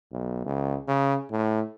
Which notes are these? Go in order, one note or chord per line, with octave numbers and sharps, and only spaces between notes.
B1
C#2
C#3
A2